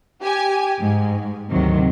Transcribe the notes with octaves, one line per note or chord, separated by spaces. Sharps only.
G4 G#5
G#2
D2 C3 D#3 F#3